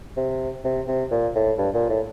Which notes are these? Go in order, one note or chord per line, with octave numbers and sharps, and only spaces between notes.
C3
C3
C3
A#2
A2
G2
A#2
A2